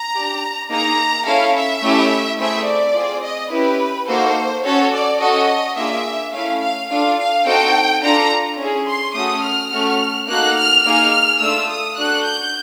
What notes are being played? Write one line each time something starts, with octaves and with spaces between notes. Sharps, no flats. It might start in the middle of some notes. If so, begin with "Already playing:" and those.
Already playing: A#5
D4 G4
A#3 D#4 G#4 A#5
C#4 E4 A4 F5
E5
A3 C#4 E4 G4
A3 C4 E4 G#4 E5
D5
C4 F4 G#4
D#5
C#4 E4 G4 B4
A#3 D#4 F#4 A4 C5
C#4 F#4 A4 C#5
D5
C#4 F#4 A4 D#5
A#3 D4 F4 G#4 E5
A3 C#4 E4 F5
F5
D4 F4 A4 F5
F5
C4 D#4 F#4 A4 G5
D4 F4 A4 A#5
C#4 E4 G#4
C6
A3 C#4 F#4 A4 D#6
F6
A3 C#4 F#4 A4
A#3 D#4 F#4 A4 F#6
F6
A#3 D#4 G#4 F6
A3 D4 F4 E6
D#6
D4 F#4 A4 F#6
G6